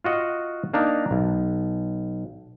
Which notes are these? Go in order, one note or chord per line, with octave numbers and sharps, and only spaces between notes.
F4 F#4 D#5 F#5
A#3 D4 D#4 A#4
B1